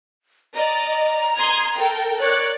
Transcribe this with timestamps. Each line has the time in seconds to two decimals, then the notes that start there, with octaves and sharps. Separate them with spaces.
0.55 D5 D#5 A#5
1.39 C6 D#6 G#6
1.78 A4 A#4 G5
2.20 A#4 C#5 D5 F#6